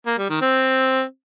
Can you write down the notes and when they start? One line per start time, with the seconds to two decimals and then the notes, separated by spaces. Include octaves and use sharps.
0.06 A#3
0.18 G3
0.30 D#3
0.41 C4